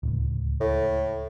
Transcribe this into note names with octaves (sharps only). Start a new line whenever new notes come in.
D1 C#2
A2